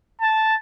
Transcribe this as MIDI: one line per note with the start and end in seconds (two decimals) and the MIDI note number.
0.21 0.55 81